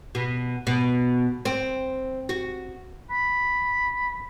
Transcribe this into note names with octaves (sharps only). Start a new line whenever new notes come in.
B2
B2
C4
F#4
B5